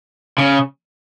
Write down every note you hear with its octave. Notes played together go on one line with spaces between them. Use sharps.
C#3